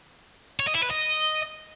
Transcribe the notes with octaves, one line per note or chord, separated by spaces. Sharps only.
C#5
D#5
E4
B4
D#5